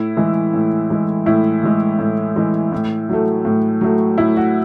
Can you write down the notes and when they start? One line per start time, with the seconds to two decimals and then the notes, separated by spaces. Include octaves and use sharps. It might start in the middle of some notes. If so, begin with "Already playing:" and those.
Already playing: A2 E4
0.17 E3 G#3
0.54 A2
0.90 E3 G#3
1.26 A2 E4
1.63 E3 G#3
1.99 A2
2.36 E3 G#3
2.72 A2
3.09 F#3 A3
3.45 A2
3.81 F#3 A3
4.18 A2 E4
4.37 F#4